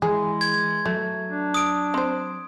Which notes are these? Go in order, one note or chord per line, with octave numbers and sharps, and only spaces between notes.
E3 G#3 G#4
G#6
F#3 A3
D4
D#6 D7
C4 C5